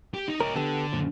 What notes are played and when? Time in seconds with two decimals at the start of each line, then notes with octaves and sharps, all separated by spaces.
0.14 G4
0.28 D#4
0.41 D#4 A#4 C#5
0.55 D3 B3 G4 A4
0.93 F#2 A#2 F3